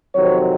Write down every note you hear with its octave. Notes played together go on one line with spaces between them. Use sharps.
F2 C3 D#3 F#3 C4 C#5